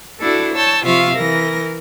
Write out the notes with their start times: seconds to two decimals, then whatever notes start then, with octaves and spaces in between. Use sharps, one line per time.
0.21 D4 E4 F#4 A4
0.53 C#5 A5 E6 G6
0.84 C3 F3 F4 E5 F5 C#6
1.15 E3 A#4 A#6